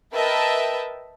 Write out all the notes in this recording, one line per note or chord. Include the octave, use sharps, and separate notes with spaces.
A#4 B4 D#5 E5 G5 A5